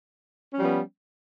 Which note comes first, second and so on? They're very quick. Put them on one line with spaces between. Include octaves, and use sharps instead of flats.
C#4 G3 F3 B3